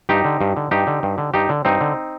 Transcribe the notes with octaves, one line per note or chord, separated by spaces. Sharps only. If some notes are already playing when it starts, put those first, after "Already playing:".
G2 D#4 G4
D3
G2
D3
G2 D#4 G4
D3
G2
D3
G2 D#4 G4
D3
G2 C4 D#4
D3